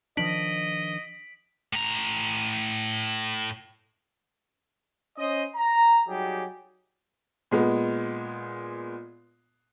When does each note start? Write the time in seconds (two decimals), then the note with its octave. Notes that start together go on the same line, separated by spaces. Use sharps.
0.17 D#3 F3 D4 D#5 B6 D7 F#7
1.73 A2 A#5
5.18 C#4 C5 D#5
5.56 A#5
6.08 F#3 G3 D#4 G4 G#4
7.51 A#2 G#3 B3